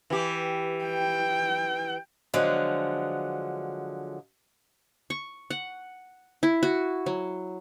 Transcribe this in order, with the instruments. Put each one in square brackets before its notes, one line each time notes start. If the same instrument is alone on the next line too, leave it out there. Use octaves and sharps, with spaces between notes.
[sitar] E3 G4
[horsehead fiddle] G5
[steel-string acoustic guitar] D3 F3 F#3 G#3
[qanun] C#6
F#5
E4
F#4
F#3